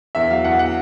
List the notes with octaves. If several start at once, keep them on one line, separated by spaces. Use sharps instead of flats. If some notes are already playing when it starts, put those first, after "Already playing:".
E2 E5
F#3 F5
E2 F#5
F#5